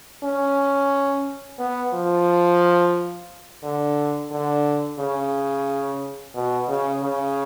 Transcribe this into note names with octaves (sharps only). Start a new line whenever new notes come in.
C#4
B3
F3
D3
D3
C#3
B2
C#3
C#3